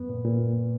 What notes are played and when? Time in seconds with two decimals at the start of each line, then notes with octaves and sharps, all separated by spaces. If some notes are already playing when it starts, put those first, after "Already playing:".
Already playing: F#2 B3 B4
0.09 A#2
0.25 A#2